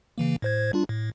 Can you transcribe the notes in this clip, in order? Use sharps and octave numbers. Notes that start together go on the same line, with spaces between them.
C#3 E3 A#3
A2 C5 G#6
G3 D4 F4
A2